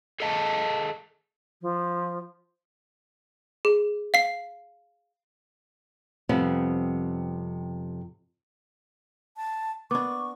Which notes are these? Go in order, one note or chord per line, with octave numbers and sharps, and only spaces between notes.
G#4 A4 D#5 F5 A5
F3
G#4
F5 C7
F2 C3 G3 B3
A5
B3 D4 C#6 D6